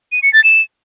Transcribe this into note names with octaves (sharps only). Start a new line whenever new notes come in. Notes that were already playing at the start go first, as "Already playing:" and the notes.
D#7
C#7
A6
E7